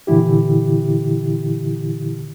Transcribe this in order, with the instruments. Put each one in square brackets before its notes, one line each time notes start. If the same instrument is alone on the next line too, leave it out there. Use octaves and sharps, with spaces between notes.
[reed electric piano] A#2 D3 E3 E4 G4